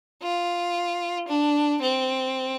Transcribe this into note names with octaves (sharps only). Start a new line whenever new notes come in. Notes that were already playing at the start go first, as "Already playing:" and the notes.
F4
D4
C4